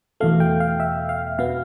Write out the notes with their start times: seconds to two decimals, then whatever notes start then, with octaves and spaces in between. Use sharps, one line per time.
0.20 E2 B2 A3 F5
0.40 G5
0.60 F5
0.80 E5
1.09 F5
1.39 B2 B3 F5